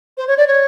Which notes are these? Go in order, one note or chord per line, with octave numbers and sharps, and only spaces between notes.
C5
C#5
D5
C#5